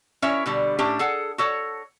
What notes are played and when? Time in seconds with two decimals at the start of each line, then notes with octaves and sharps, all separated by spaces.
0.22 C#4 E4 A#4 C#5 E5
0.46 B2 D3 G3
0.79 A2 C#4 D4 G4
0.99 G#4 A4 F#5
1.38 F#4 A4 C#5